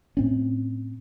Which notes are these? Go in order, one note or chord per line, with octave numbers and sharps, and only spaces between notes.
A2 C4 C#4